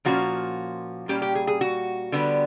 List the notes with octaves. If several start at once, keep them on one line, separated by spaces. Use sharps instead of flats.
A#2 F3 A#3 C#4 F#4
A#2 G3 A#3 C#4 G4
G4
G#4
G#4
F#4
D3 G3 B3